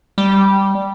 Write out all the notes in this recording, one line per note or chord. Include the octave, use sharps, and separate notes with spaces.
G3